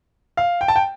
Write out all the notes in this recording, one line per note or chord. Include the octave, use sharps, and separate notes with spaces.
F5
G5
A5
G5